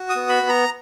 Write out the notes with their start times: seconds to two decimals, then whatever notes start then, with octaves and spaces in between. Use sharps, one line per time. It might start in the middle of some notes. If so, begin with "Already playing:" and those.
Already playing: F#4
0.09 D#6
0.16 B3
0.29 B5
0.43 B3
0.49 A#5